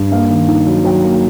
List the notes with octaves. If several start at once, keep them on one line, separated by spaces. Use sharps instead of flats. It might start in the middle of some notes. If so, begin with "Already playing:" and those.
Already playing: G2
A#3 F5
D#3
D#4
F#3
F#3 G5
A#3